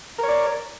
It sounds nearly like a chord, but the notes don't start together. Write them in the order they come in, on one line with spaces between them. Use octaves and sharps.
A#4 C#5 D5